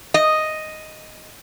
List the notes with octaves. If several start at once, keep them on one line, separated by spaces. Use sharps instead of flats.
D#5